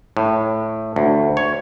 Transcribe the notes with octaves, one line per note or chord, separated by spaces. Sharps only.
A2
D2
C#5